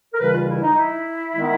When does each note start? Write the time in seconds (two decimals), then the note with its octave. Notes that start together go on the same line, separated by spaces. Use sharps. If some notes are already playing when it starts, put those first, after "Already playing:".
0.14 A#4
0.20 D#2 C#3 E3 G3 B4
0.34 F4
0.48 E4
0.62 D#4
0.77 E4
1.35 D#3 G#3 B3 D#4